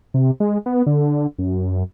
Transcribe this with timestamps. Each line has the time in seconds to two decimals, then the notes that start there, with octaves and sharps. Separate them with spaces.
0.14 C3
0.40 G#3
0.66 B3
0.86 D3
1.39 F#2